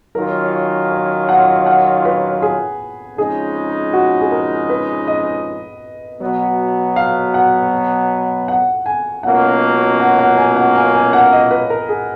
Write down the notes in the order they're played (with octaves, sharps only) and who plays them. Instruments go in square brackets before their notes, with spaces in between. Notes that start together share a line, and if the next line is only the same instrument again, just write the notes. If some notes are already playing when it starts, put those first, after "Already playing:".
[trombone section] D#3 F#3 C#4 F4 [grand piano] A#4
[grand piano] C#5
F#5
F#5
B4
G#4
[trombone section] F2 C#3 G#3 D#4 [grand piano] G#4
[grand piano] F#4
G#4
A#4
B4
D#5
[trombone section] B2 F#3 B3
[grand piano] F5
F#5
F#5
G#5
[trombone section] C#2 B2 F#3 A#3 C#4 [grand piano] F#5
[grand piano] F#5
F#5
G#5
F#5
G#5
G#5
F#5
D#5
B4
A#4
G#4